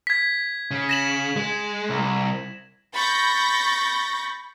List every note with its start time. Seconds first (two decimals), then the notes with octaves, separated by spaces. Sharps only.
0.07 G#6 B6
0.71 C#3
0.89 A#6 E7 F#7
1.37 G#3
1.90 C2
2.95 B5 C#6 G6 A6 A#6